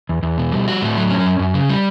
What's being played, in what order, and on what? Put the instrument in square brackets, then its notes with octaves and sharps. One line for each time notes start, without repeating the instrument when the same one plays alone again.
[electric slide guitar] E2
E2
B2
G3
F#4
A2
F#3
C#4
F#2
F#2
C#3
G3